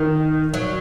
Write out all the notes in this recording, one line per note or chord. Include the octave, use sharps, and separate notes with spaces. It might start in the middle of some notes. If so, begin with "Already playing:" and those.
Already playing: D#3
F#3